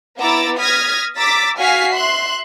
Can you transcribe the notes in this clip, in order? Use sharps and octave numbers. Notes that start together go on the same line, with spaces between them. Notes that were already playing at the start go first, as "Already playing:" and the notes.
B3 E4 A#5 D6 E6 A6
D#6 F6 G#6 A#6 B6
A#5 D6 E6 A6 B6
F#4 F5 G#5 F6 B6 C7
E5 C6 F#6